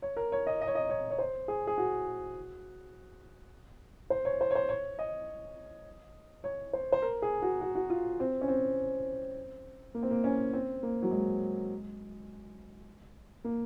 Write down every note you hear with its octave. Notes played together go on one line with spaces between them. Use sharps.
C#5
A#4
C#5
D#5
D#5
C#5
D#5
C#5
C#5
C5
G#4
G#4
F#4
C5
C#5
C5
C#5
C5
C#5
D#5
C#5
C5
C5
A#4
G#4
F#4
F#4
F#4
F4
C4
C#4
C4
A#3
C4
A#3
C#4
C4
A#3
F#3
G#3
A#3